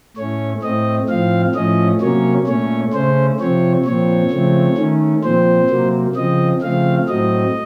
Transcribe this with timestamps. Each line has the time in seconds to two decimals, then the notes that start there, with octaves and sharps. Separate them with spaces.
0.17 A2 A3 C#4 C#5
0.62 A2 A3 C4 D#5
1.09 A2 F3 C4 F5
1.55 A2 F3 A3 C#4 D#5
2.01 C3 F#3 A#3 C#4 C#5
2.47 A#2 A3 C#4 C#5
2.94 C#3 A3 C#4 C5
3.40 C3 F3 C4 C#5
3.85 A#2 F3 C4 C#5
4.31 C#3 F3 A3 C4
4.78 D#3 A3 C#4
5.24 A#2 F3 C4 C5
5.70 C3 F#3 A#3
6.16 C#3 F3 C4 D#5
6.62 C#3 F3 A3 C4 F5
7.08 A2 F#3 A3 C4 D#5